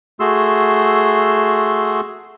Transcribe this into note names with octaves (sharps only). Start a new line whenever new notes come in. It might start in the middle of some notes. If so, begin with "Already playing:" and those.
A3 F#4 G#4 C6 E6